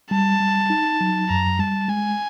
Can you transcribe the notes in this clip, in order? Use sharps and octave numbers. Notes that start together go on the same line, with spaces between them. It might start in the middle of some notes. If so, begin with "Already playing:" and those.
G3 A5
G3
D#4
F#3
F#2 A#5
G3 A5
G#3 G#5